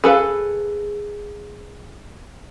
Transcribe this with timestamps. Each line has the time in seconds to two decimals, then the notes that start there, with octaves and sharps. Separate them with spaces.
0.04 G#4 A4 B4 F5